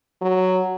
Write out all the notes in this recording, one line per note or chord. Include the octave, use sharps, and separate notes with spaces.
F#3